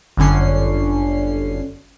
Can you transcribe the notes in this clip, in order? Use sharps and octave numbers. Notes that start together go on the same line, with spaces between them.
G1 F#2 D3 C#4 C7